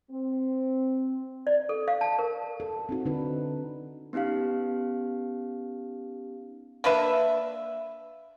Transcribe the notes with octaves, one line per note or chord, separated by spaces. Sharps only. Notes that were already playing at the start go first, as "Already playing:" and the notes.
C4
D5
A4
F5
A5
A#4
A4
C4 D#4 F#4
D3 C4 D4 D#4 B4
B3 C#4 D#4 G4 F5
A#3 D4 B4 E5